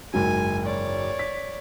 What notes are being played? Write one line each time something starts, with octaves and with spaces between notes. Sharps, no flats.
F#1 G#2 F#3 G#5
C#5 D5
B6